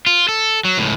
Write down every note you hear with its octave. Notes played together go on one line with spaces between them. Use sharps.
F4
A4
F#3
C#2 A2